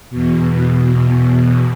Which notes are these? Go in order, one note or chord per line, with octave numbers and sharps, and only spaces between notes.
E2 B2